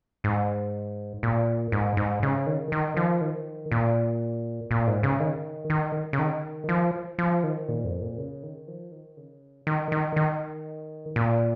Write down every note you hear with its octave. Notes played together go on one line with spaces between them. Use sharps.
G#2
A#2
G#2
G#2
C#3
D#3
D#3
F3
D#3
A#2
A#2
G#2
C#3
D#3
D#3
C#3
D#3
F3
F3
D#3
A#2
F2
A#2
C#3
D#3
F3
D#3
C#3
D#3
D#3
D#3
A#2